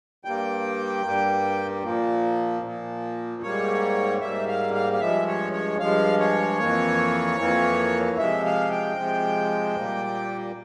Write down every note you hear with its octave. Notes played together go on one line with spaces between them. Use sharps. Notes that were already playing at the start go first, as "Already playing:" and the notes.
G2 G3 A#3 G5
G2 G3 A#3
A#2 F3 A#3
A#2 F3 A#3
G#2 G3 A#3 C#5
G#2 G3 A#3 E5
F5
F5
F5
G2 F3 G#3 E5
C#5
C#5
G2 F3 G#3 F5
C#5
F2 E3 A#3
F2 E3 A#3
C3 F3 G#3 E5
F5
G5
C3 F3 G#3
A#2 G3 A#3